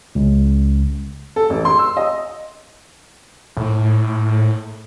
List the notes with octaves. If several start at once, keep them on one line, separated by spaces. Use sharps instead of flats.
C#2
A4
A1
C6
E6
D#5
A2